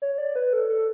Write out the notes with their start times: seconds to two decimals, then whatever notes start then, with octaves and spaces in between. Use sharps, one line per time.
0.02 C#5
0.18 D5
0.36 B4
0.53 A4
0.69 A4